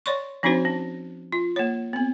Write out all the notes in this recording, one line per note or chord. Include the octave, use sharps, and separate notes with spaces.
C#5 D5 C6 C#6
F3 C4 D4 D#4 F#4 C5
C#4
F4
A#3 C#5
B3 C4